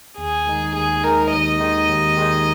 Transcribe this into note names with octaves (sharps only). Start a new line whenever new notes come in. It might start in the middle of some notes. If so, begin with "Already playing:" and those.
D#2 G#4
D#3 G#3 D#4
D#2 G#4
D#3 G#3 D#4 A#4
D#2 D#5
D#3 G#3 D#4
D#2
D#3 G#3 D#4